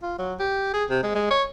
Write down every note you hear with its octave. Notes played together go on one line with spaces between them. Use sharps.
F4
F#3
G4
G#4
C3
G#3
G#3
C#5